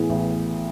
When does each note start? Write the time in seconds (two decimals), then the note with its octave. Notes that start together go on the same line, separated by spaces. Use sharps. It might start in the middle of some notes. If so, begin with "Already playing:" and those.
Already playing: A2 E3 B3 G#4
0.10 A1